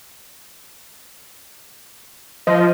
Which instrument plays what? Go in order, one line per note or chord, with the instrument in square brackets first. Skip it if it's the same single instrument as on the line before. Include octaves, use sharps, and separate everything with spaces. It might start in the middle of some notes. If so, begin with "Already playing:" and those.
[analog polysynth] F3 [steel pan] D#5